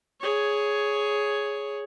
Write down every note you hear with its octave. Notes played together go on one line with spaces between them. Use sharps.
G#4 C#5